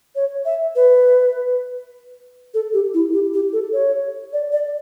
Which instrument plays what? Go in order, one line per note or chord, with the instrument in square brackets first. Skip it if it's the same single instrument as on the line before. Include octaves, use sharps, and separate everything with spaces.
[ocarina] C#5
E5
B4
A4
G4
E4
G4
G4
A4
C#5
D5
D5